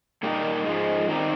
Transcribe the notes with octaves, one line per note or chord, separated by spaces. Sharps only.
A#2 G3 A#3 D#4
G#2 F3 G#3
D#3 G3 C4 D#4